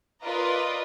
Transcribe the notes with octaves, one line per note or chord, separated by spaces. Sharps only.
F4 A#4 B4 D5 D#5